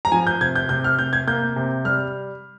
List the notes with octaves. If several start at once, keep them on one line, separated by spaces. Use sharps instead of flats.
A#5
F3 G#5
G6
C3 G#6
G6
C3 G6
F6
C3 G6
G#6
A#3 G6
C3
G3 F6